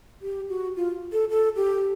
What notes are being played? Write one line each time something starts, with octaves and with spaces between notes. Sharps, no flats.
G4
F#4
F4
A4
A4
G4